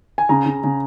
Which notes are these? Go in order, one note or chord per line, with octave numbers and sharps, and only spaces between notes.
G#5
C#3 A#5
C#3
C#3